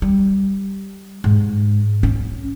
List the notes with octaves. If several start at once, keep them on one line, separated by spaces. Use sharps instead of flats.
G3
G#2
C#4